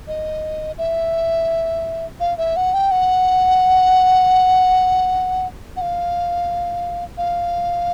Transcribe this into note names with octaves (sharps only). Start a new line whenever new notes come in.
D#5
E5
F5
E5
F#5
G5
F#5
F#5
F5
F5